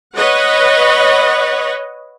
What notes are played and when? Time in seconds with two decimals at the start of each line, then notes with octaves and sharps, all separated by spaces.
0.16 B4 C#5 D#5 F#5